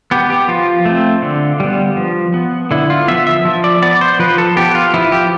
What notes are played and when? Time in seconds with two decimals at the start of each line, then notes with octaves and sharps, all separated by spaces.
0.11 B3 G4
0.30 G4
0.48 F3 F4
0.85 A3 C4
1.22 D3
1.60 G3 B3
1.97 F3
2.34 B3
2.71 D3 E4
2.90 F4
3.08 F3 B3 E5
3.27 E5
3.45 F3
3.64 D5
3.82 B3 D5
4.01 C5
4.19 F3 B4
4.38 A4
4.57 B3 G4
4.75 F4
4.94 F3 E4
5.12 G4